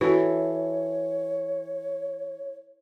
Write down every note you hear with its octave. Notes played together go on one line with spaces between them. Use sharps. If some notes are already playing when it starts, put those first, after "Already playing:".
E3 F#4 A4 C#5